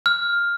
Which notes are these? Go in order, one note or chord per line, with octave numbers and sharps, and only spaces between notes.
F6